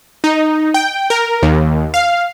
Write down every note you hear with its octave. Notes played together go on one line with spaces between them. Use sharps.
D#4
G5
A#4
D#2
F5